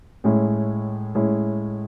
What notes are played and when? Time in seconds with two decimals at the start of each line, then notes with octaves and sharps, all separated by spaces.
0.24 A2 G#3 C#4 E4
1.15 A2 G#3 C#4 E4